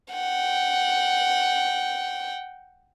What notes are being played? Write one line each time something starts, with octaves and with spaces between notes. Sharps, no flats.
F#5 G5